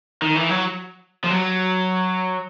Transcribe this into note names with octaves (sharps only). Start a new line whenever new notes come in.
D#3
E3
F#3
F3
F#3